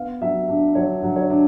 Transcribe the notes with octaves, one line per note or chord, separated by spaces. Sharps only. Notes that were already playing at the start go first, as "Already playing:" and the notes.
Already playing: B3 F5
F#3 E5
D4
F#3 C#5
F#3
C#5
D4